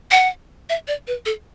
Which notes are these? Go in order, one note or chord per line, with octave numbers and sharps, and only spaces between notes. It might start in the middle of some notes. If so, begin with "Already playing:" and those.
F#5
E5
D5
B4
A4